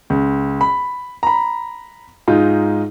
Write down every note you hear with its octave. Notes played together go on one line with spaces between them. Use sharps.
C#2
B5
A#5 B5
G#2 D#4 F4